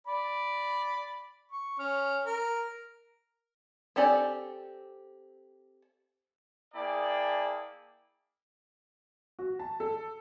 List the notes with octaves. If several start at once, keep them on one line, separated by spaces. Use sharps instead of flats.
D5 B5
C#6
C#4 F6
A#4
C4 G4 A4 D5 G#5
A#3 E4 G#4 D5 G5 A5
F#4
A5
A4